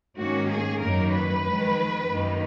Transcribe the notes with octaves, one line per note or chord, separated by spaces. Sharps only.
G#2 D#3 A#3 C#4 F#4
G#4
F#2 D#3 F#3 A#3 A#4
B4
F2 D#3 G#3
F#2 D#3 A#3 D#4